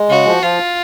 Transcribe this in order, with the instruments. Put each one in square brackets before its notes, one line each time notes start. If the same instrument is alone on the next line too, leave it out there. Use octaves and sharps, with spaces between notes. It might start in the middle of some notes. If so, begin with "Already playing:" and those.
Already playing: [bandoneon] G#3
[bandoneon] C#3 [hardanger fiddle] F#4
[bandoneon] F3
[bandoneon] F3 [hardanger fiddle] F4